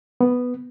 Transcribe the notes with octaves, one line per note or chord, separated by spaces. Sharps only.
B3